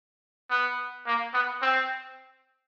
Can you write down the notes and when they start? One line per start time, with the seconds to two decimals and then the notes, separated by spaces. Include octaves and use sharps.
0.50 B3
1.06 A#3
1.34 B3
1.62 C4